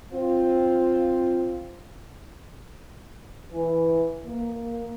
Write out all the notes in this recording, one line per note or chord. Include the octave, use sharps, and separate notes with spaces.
C4 F4
E3
A#3